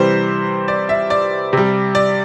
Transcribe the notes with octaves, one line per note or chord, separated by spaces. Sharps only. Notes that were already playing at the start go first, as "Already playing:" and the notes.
Already playing: C3 E3 G3 C5
D5
E5
D5
C3 G3
D5